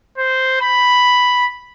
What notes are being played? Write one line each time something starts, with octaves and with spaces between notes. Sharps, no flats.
C5
B5